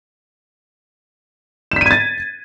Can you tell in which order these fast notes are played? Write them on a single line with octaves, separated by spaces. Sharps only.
E7 B6 D#7 G#6 A6